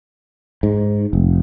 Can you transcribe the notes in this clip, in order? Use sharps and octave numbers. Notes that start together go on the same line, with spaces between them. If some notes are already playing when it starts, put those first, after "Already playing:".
G#2
F1